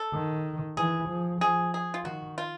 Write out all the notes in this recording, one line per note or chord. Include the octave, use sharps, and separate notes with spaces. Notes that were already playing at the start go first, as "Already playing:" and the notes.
Already playing: A4
D#3
E3 G#4
F3
F3 G#4
G#4
F4
D#3 F#4
F4